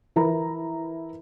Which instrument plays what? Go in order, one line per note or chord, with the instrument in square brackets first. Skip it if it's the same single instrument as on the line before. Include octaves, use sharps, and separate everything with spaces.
[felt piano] E3 E4 A#4 B4 A#5